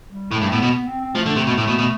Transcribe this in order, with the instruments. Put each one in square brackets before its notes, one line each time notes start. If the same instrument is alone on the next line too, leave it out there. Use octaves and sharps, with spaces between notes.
[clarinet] G3
[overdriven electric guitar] A2 [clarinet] A3
[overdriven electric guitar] G2
[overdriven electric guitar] A2 [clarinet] B3
[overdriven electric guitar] B2
[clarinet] B3
C4
C4
[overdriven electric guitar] F3 [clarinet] A3
[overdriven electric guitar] D3
C3
B2
A2
B2
B2